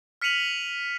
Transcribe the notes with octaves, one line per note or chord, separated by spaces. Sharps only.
F6 B6 C#7 D#7 F7 F#7